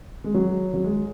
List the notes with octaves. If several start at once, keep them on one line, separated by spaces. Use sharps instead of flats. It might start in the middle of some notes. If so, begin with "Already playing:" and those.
G#3
F#3
F#3
G#3